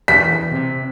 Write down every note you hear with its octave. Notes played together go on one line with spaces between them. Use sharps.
E2 B6
C3